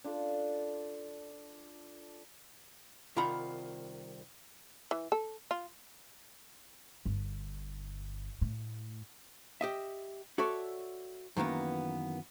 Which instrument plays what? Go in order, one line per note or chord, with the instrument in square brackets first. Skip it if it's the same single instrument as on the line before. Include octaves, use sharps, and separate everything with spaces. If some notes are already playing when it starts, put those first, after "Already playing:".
[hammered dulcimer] D4 F4 A4
[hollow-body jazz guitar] C2 D#3 F4 F#5 A#5 B5
[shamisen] E3
A4
F4
[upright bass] G1
A2
[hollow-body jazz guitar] G4 D#5 E5
F#4 A4 C#5 D5 E5
F#2 D#3 E3 A#3 B3